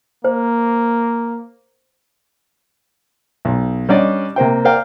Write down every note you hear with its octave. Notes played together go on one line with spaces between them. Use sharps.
A#3 C5
B1
G3 C#4 D4 D5 D#5
C3 A#3 C5 G5
A#4 C5 D5 F5 G5